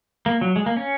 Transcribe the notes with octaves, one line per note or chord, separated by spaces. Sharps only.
A#3
F#3
G#3
A#3
C#4